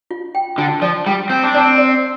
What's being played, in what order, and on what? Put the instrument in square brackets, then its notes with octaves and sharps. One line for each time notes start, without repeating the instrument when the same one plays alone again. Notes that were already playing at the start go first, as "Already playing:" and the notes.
[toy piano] F4
G5
[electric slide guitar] D3 [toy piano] F4
[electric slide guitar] F3 [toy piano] D5
[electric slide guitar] G3 [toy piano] G5
[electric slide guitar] C4 [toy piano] G5
[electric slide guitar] D4
[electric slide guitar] C4 [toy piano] D5
[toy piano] D5